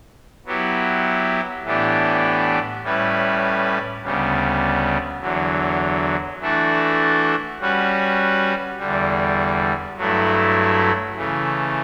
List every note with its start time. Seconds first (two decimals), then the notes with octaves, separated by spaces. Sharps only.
0.46 F#3 B3 E4 G4
1.64 A2 E3 B3 D4 G4
2.83 A2 G3 C#4 E4 B4
4.02 D2 C#3 G3 B3
5.21 E2 D3 F#3
6.40 E3 A3 D4 F#4 A4
7.59 G3 C#4 F#4 B4
8.78 E2 D3 G3
9.97 G2 F#3 A3 E4
11.16 C#3 E3 A3